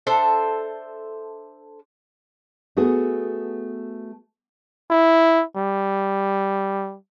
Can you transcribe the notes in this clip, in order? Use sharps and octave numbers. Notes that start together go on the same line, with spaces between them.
D4 A4 C5 E5
A3 B3 F#4 G#4
E4
G3